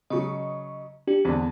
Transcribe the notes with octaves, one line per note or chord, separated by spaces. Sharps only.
C#3 F#3 D#5 C#6
D4 G4
E2 D3 C4